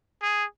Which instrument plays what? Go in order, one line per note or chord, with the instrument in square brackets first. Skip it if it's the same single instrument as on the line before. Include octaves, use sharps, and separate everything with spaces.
[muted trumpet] G#4